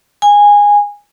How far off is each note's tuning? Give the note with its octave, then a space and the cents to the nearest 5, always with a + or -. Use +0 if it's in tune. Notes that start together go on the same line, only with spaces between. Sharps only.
G#5 -15